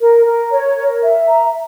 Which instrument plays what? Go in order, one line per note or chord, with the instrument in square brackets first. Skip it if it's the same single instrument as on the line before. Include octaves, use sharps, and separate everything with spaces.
[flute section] A#4
A#4
C#5
A#4
E5
A#5